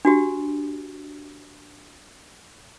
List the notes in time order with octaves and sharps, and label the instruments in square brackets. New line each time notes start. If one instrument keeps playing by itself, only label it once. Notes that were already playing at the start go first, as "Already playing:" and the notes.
[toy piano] D4 F#4 G4